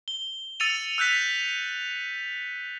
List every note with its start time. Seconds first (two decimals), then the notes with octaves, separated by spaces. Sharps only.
0.08 G7
0.60 E6 A6 C#7 D#7 F7
0.98 E6 F#6 G6 B6 F7